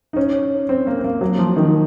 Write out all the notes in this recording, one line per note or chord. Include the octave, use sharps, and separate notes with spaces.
D#4
C#4
C4
A#3
C4
A#3
F#3
F3
D#3